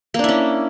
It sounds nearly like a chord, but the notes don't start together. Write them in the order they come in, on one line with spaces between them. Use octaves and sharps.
A#3 D4 E4 C#4